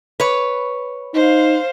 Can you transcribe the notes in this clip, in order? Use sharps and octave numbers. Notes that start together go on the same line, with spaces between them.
B4 C#5
D#4 C5 F5